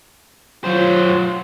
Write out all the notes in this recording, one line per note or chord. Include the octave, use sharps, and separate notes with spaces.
F#3 F4 C5